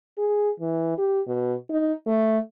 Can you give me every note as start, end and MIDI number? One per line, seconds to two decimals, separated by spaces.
0.18 0.50 68
0.60 0.96 52
0.98 1.21 67
1.27 1.54 47
1.70 1.93 63
2.07 2.38 57